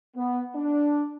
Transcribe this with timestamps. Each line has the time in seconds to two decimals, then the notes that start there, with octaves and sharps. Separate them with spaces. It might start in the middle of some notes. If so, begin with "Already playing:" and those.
0.16 B3
0.56 D4